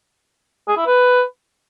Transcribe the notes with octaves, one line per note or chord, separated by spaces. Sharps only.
G#4
E4
B4